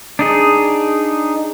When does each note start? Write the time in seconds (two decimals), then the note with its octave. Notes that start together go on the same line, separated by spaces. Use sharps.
0.19 D4 D#4 G#4